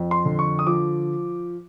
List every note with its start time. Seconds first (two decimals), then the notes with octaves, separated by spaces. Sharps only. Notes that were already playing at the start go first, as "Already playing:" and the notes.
Already playing: F2
0.11 C6
0.25 D3
0.39 C#6
0.59 D#6
0.67 F3 D6